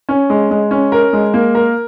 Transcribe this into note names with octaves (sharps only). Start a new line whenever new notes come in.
C#4
G#3
G#3
C#4
A#4
G#3
A#3
A#4